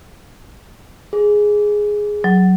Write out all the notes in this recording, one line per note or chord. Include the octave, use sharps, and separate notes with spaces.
G#4
F#3